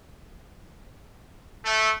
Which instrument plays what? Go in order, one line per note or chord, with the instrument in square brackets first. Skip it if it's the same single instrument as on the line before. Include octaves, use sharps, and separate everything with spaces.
[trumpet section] A3